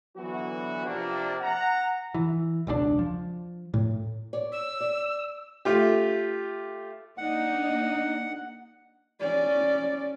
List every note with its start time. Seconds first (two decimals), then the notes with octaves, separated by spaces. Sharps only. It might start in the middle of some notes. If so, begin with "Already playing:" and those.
0.16 D3 E3 F#3 B3 F#4
0.85 C3 F3 A#3 D4
1.41 F#5 A#5
2.14 E3
2.67 E1 C#2 C3 D4
2.99 F3
3.74 A2
4.33 C#5 D5
4.52 E6
4.80 D5
5.65 A3 F4 G4
7.18 A#3 D4 D#4 F#5
9.20 C#4 D5